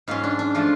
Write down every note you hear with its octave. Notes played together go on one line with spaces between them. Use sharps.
G#2 F#3 C#4 F4
D4
D4
F3 A3 F4